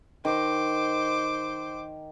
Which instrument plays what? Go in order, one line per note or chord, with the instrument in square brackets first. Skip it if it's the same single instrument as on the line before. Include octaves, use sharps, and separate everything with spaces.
[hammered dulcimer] D#3 [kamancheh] C5 D6